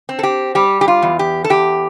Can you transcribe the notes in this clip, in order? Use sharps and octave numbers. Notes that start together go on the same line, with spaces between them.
C4
A4
G4
G3 G4
G4
F4
E2
G4
A4
E2 G4